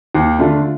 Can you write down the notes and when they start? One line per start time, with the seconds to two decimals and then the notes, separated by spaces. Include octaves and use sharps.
0.15 D#2
0.39 D3 A3 D4 F4